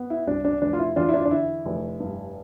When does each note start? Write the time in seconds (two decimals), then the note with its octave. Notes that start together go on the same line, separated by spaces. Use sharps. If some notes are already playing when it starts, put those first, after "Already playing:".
Already playing: B3
0.10 E4
0.27 C2 D4
0.45 D4
0.62 F1 D4
0.73 F4
0.79 E4
0.96 E2 D4 F4
1.09 E4
1.14 D4 F4
1.25 D4
1.31 D3 E4
1.66 F1
2.00 G2